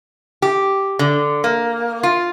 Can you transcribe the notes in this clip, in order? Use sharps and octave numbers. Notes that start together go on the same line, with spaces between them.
G4
D3
A#3
F4